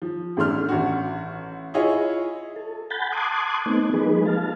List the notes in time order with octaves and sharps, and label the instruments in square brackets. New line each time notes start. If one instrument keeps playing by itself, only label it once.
[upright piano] F3
A1 A3 D4 C6 F6
A1 F#4
E4 F4 G#4 C#5 D#5 E5
[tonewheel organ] A4
F#5 G#5 B5 G6 A6
A5 C6 D6 D#6 F#6 G#6
A3 B3 C4 D#4
F3 G#3 A#3 D#4 G#4 B4
F5 A5